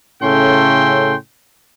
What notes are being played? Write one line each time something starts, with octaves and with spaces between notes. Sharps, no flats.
A2 C#3 C#4 A4 G5 C6